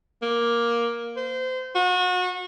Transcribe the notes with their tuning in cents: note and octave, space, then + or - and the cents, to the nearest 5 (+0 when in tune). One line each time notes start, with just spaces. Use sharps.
A#3 +10
C5 -25
F#4 -35